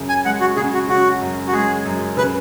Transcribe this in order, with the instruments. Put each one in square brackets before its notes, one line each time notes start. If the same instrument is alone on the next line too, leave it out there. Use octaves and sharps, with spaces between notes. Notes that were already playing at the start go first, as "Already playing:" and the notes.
Already playing: [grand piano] F#2 C#3
[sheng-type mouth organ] G#5
[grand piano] G#3 [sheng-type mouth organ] F#5
[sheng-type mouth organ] F#4
[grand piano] C#3 [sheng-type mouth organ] G#4
[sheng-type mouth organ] F#4
[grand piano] C#3 [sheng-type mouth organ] F#4
[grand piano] F#2
[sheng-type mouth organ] F#4
[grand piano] G#3 [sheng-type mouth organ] G#4
[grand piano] F#2
[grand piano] C#3 [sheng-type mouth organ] B4